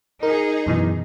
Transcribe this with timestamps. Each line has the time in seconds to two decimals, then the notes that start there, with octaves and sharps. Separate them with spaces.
0.23 D#4 G#4 A#4
0.67 F#2 B2 E3